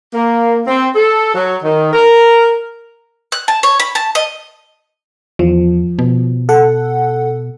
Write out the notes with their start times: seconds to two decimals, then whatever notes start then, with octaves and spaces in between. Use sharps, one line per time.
0.15 A#3
0.67 C4
0.95 A4
1.35 F#3
1.62 D#3
1.93 A#4
3.32 F#6
3.48 A5
3.63 C#5
3.80 B5
3.95 A5
4.15 D#5
5.39 E2 F3
5.99 B2
6.49 A4 F#5